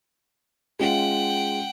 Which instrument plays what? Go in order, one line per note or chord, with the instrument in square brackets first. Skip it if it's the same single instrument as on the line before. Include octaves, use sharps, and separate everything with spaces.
[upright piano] G#3 C#4 F4 [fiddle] F#5 G5